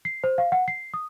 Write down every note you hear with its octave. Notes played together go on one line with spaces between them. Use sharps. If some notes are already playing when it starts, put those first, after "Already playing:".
C7
C5
F5
F#5
C7
D#6